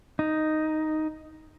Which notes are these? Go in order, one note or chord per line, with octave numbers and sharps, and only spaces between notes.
D#4